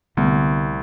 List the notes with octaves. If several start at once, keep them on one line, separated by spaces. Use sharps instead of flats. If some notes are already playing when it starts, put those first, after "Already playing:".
C2 D3 A3 B3